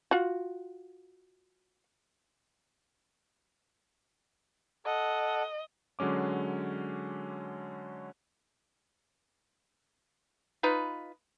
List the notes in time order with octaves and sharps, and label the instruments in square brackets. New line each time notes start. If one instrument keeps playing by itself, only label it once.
[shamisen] F4 F#4
[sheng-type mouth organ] A4 F#5 [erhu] D#5
[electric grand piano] D3 F#3 G#3 C#4 D6
[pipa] D#4 F4 B4